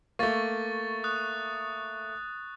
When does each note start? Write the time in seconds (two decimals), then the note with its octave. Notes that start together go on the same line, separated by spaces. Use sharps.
0.19 A3 A#3 C#6 A6
1.04 D#6 F#6